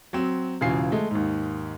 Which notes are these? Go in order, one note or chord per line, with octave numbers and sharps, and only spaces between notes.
F#3 C4
E1 C#3 E3 F4 G#5 C7
G#3 A3
D#2 G#2